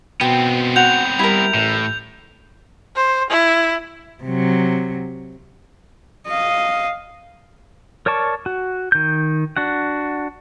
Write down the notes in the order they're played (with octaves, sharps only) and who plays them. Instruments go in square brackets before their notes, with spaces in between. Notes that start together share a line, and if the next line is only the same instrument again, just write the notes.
[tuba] B2 [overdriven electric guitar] B3 C4 [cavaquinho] G5
[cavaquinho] F#4 [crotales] G6 F7
[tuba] G3 [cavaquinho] E4 A#4
[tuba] A1 [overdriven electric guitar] A2
[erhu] C5
E4
[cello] C3 F#3
[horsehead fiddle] D#5 F5
[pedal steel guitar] A#4 C#5 D5 A5 C#6
F#4
D#3 G6
D4 F#4 F#5